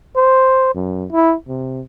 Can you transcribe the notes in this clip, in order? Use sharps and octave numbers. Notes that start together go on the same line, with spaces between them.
C5
F#2
E4
C3